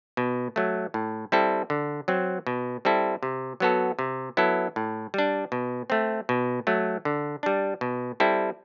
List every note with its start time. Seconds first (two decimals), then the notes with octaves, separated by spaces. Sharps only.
0.17 B2
0.56 F#3 A3
0.94 A2
1.32 G3 C4 E4 A4
1.70 D3
2.08 F#3 C4
2.47 B2
2.85 G3 C4 E4 A4
3.23 C3
3.60 F#3 B3 F#4 A4
3.99 C3
4.37 F#3 B3 E4 A4
4.76 A2
5.14 G3 D4
5.52 B2
5.90 A3 C4
6.29 B2
6.67 F#3 A3
7.05 D3
7.43 G3 D4
7.81 B2
8.20 G3 C4 E4 A4